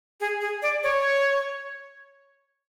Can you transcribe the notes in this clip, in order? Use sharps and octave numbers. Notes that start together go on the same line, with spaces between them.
G#4
G#4
D5
C#5